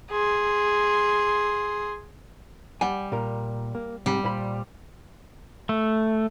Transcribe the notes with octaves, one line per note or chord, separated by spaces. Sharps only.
G#4 C6
G3 D5 F#5 G#5
A#2 A#4
A#3
G#2 C3 G3
A#2 C5 B5
A3